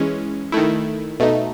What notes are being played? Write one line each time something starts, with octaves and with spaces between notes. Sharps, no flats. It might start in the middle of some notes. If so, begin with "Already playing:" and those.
Already playing: E3 G#3 C#4
D#3 A3 E4
B2 A3 D#4